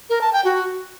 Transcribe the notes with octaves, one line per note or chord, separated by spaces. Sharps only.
A#4
A5
G5
F#4